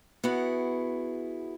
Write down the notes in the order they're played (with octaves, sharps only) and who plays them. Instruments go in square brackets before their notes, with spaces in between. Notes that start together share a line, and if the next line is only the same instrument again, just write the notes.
[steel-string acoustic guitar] B3 E4 F#4 G#4